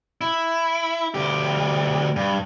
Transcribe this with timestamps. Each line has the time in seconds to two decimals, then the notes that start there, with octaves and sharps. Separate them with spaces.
0.21 E4
1.14 D2 G4
2.16 G2